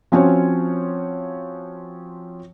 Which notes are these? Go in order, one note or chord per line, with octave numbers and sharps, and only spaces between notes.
F3 C4 C#4 F4 F#4 C#5